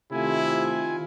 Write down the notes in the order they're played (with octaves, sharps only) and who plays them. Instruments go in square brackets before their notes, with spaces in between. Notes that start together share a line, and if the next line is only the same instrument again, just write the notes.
[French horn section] C3 A3 G4 [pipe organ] D#3 F4 G#5 [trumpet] E4